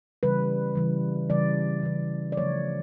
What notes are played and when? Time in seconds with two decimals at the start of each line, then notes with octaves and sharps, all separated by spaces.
0.23 C#3 E3 G3 B4
0.75 C#3 E3 G3
1.30 C#3 E3 G3 D5
1.83 C#3 E3 G3
2.32 D5
2.37 C#3 F3 A3 C#5